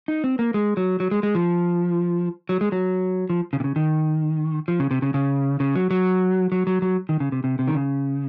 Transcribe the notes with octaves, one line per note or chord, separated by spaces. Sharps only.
D#4
C4
A#3
G#3
F#3
F#3
G#3
G#3
F3
F#3
G#3
F#3
F3
C#3
C3
C#3
D#3
F3
C#3
C3
C#3
C#3
C#3
F#3
F#3
F#3
F#3
F#3
D#3
C#3
C3
C3
C3
D#3
C#3